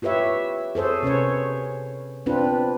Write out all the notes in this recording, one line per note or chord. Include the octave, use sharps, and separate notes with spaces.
F4 G4 B4 C#5 E5
G#4 A4 C5 C#5
C3 C#4 B4 C#5
C4 D4 F4 B4